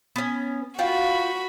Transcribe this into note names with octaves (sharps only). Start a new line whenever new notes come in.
B3 C#4
F4 F#4 G5 B5